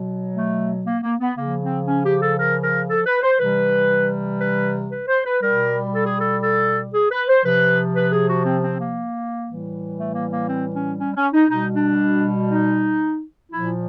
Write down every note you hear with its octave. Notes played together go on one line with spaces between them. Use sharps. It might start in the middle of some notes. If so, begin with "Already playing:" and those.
Already playing: B2 F#3
A3
A#3
A#3
B3
C#3 F3 A#3
C4
C#4
G4
A4
A#4
A#4
A4
B4
C5
C3 E3 G3 B4
B4
B4
C5
B4
B2 G3 A#4
A4
G#4
A4
A4
G#4
B4
C5
C3 F3 B4
B4
G#4
F#4
C4
C4
A#3
A2 E3 G3
A3
A#3
A#3
C4
C#4
C#4
C#4
D#4
B2 G3 D#4
D4
D#4
A#2 F3 E4